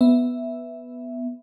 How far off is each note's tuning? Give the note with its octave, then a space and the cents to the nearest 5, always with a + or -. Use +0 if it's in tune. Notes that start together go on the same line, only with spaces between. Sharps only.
B3 +0 E5 +0